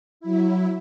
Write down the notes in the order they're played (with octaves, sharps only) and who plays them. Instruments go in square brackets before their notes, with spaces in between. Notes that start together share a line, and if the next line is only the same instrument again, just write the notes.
[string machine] F#3 E4